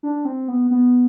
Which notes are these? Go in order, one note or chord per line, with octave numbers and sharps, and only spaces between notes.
D4
C4
B3
B3